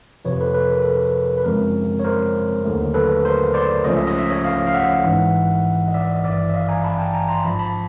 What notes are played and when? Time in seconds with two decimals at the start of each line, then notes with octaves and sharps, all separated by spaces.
0.25 F2 C3 F3 B4 C#5
0.40 A4 B4
0.54 A4 B4
0.70 A#4
0.85 A4
1.38 B4
1.44 F#2 C#3 F3 G#3 C4 A#4
1.99 C#5
2.04 A#4 C5
2.64 D#2 D3 F#3 A3
2.94 A4 B4
3.25 A#4 C5
3.54 C5 D5
3.84 C#2 C#3 F3 A3 C#4 D#5
3.96 E5
4.07 D#5
4.19 E5
4.30 C#5 D#5
4.44 D#5 F5
4.67 F5
4.74 E5 F#5
5.05 A1 G#2 E3
5.88 D#5
5.94 D5 E5
6.14 D#5
6.24 G#1 G2 E3 D5 E5
6.50 E5
6.54 D#5 F5
6.69 G#5 A#5
6.84 A5 B5
6.99 G5 A5
7.14 G#5 A#5
7.29 A#5 C6
7.44 A1 G#2 F3 A5 B5
7.59 A5 B5